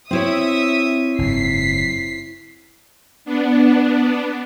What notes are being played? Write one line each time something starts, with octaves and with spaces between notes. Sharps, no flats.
C4 E4 C#5 E5 D#6
F#1 G#2 B6 C7
B3 D4